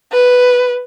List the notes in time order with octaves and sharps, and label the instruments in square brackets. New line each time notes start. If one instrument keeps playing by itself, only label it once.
[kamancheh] B4